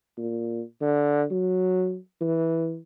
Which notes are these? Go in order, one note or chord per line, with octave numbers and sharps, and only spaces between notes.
A#2
D3
F#3
E3